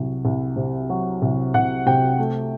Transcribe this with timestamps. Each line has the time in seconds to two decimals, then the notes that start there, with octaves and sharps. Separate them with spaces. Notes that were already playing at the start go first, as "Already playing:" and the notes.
Already playing: C2 F#3
0.25 C2
0.56 C3
0.90 F#3
1.22 C2
1.54 C2 F#5
1.86 C3 G5
2.19 A3